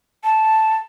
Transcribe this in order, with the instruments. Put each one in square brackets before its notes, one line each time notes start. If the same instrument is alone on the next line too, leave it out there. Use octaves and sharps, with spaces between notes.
[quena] A5